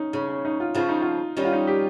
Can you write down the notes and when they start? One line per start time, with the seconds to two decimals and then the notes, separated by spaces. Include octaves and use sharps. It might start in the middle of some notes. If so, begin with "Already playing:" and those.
Already playing: C#4 D#4
0.13 C#3 C#4
0.28 C#4
0.45 D#4
0.60 F4
0.75 C#3 F3 F4
0.89 D#4
1.02 F4
1.37 D#3 G3 C#4
1.45 F4
1.53 D#4
1.67 G4